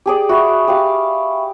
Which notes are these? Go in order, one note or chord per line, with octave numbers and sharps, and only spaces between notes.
G4 G#4 D5
F#4 E5 B5 C#6
G4 F5